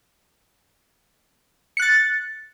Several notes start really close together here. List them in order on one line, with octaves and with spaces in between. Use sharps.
C#7 F#6 A6